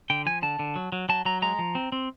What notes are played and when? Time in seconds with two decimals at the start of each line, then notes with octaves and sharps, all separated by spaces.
0.10 D3 G5
0.26 F3 G#5
0.42 D3 A5
0.59 D3
0.76 F#3
0.92 F#3
1.09 F#3 A5
1.25 F#3 A#5
1.42 G#3 A#5
1.59 F3
1.75 C4
1.92 C4